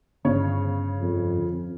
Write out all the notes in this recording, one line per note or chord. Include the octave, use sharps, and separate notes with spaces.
G1 C#3 C#5
F2